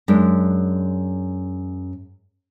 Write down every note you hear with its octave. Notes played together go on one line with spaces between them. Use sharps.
F#2 G#3 D4